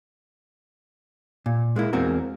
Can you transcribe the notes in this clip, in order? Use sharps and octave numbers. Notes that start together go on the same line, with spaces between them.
A#2
G#3 A#3 E4
E2 G#3 A#3 C4 F#4 A#4